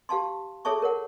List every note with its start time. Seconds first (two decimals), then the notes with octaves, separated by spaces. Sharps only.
0.09 G4 F5 A5 C6
0.65 G#4 A4 C#5 E5 A5 C#6
0.82 A#4 C#5 F#5